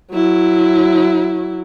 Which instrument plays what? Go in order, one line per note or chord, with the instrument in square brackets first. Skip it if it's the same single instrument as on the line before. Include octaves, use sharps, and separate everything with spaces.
[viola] F#3 E4